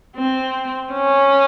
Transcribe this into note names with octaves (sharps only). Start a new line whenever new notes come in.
C4
C#4